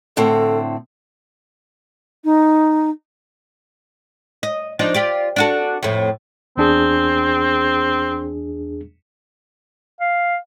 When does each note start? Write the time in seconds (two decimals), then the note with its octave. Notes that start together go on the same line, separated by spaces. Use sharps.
0.17 A2 D3 C4 A4
2.24 D#4
4.43 D#5
4.79 F3 D4 D#4
4.94 F4 G4 D5
5.36 D4 F#4 A4
5.83 F2 A2
6.57 E2 C4 D4 G#4
10.01 F5